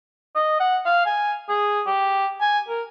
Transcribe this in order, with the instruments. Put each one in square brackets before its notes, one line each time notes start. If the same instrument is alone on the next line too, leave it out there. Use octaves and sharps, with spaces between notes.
[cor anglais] D#5
F#5
F5
G#5
G#4
G4
G#5
A#4